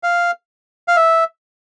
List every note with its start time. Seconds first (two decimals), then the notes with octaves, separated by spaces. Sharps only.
0.03 F5
0.88 F5
0.96 E5